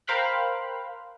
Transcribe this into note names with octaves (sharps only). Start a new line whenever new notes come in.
A#4 C5 F5 G5 B5 F#6